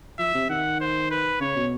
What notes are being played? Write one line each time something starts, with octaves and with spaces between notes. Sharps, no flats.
F3 E5
C3
D#3 F#5
C5
B4
C#3 C#5
B2